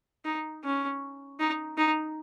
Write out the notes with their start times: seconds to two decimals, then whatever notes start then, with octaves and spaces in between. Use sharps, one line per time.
0.25 D#4
0.64 C#4
1.40 D#4
1.78 D#4